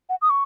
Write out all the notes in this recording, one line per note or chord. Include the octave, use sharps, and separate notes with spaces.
F#5
D#6
C#6